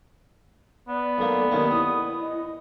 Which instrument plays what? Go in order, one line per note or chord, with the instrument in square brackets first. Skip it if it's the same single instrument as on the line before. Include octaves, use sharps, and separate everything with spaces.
[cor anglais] B3 [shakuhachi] D5
[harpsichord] B1 A#3 [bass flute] A4
[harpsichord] C3 D#3 C#4 [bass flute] A#3
[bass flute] E4 [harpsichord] D#6
[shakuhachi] D#5